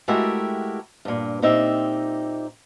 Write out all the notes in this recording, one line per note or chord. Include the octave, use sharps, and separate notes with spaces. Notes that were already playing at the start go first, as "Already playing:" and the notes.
G#3 A3 E4 F#4 G4 A#4
G2 A#2
A#2 C4 D#4 G4 E5